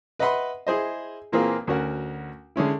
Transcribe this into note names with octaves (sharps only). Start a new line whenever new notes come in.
B4 D#5 E5 F#5 B5 C6
E4 G#4 C5 D#5
A#2 E3 A#3 C4 F4 G#4
D2 C#4 F#4 A#4 F#5
D3 G#3 C#4 E4